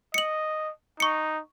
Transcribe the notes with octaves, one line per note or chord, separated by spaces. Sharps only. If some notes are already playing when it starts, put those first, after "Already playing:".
D#5 C#7 F#7
D#4 C#6 C#7